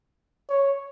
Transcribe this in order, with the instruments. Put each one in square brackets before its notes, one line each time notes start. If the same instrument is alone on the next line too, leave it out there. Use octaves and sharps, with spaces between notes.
[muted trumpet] C#5